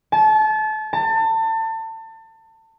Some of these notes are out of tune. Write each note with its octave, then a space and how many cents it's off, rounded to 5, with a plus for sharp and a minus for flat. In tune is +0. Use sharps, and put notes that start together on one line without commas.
A5 -30
A5 +30